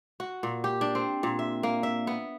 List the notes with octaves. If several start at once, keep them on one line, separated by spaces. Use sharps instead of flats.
F#4
A#2
G4
D4
C4
A#2
E5
A#3
E5
B3